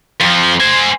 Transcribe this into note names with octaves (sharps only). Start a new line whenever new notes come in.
F2 F3
C5 G#5